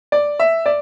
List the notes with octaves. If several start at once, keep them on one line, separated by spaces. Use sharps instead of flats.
D5
E5
D5